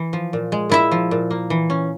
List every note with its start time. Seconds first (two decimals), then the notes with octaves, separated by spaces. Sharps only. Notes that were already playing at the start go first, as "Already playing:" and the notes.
Already playing: E3
0.13 F3
0.33 A#2
0.52 G#3
0.70 A#2 E4 E5
0.92 F3
1.11 A#2
1.31 A#3
1.50 E3
1.70 C#4